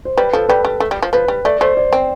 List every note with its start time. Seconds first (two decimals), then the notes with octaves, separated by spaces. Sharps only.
0.05 C5
0.18 G3 B4
0.33 F3 A4
0.49 G3 B4
0.65 G3
0.80 A3
0.91 G3
1.02 F3
1.13 F3 B4
1.28 G3
1.45 A3 D5
1.61 A3 C5
1.77 D5
1.93 C4